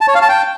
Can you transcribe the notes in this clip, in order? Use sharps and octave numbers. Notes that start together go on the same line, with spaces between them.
A5
C#5
F5
A5
G5